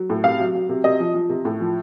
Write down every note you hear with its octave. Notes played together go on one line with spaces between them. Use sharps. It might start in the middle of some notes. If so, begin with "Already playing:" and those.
Already playing: F#3
A2
C3 F5
F#3
F#3
C3
C3 D#5
F3
F3
C3
A2
F3